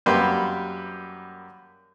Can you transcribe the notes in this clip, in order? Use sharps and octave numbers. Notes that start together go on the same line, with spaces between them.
F#2 G3 A#3 G4 B4 C6